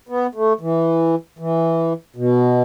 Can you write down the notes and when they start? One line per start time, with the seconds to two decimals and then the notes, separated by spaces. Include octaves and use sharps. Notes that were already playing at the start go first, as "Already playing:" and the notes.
0.09 B3
0.35 A3
0.61 E3
1.39 E3
2.16 B2